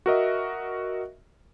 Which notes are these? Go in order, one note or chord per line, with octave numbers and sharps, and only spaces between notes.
F#4 A#4 D#5 E5